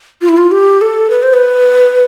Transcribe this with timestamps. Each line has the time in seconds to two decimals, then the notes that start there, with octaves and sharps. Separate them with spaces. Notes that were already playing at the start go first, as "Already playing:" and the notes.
0.22 F4
0.29 E4
0.37 F4
0.51 G4
0.81 A4
1.10 B4
1.23 C5
1.34 B4